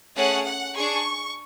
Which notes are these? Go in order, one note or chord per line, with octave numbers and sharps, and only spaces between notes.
A3 C#4 G#4 F#5
F#5
D4 G#4 C#6